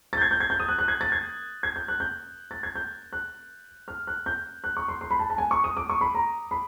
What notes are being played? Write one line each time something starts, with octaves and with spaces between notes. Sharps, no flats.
A6
G6
G#6
G6
G#6
G6
D#6
F#6
F#6
G#6
A6
G#6
G#6
G6
F#6
G6
A6
G#6
G6
F#6
F6
F#6
G6
F#6
C#6
C6
C6
B5
A5
A5
G#5
C#6
D#6
D6
C#6
B5
A#5
B5